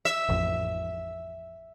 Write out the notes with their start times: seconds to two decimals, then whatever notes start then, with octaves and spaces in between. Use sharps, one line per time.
0.05 E5
0.29 A1 F2